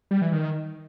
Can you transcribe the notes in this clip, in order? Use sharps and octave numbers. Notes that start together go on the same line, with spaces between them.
G3
E3
D#3